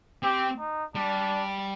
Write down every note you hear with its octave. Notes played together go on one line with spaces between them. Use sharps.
C4 G4
D#4
G3 D4